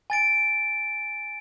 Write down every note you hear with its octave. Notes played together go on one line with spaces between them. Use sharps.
G#5 A6 D7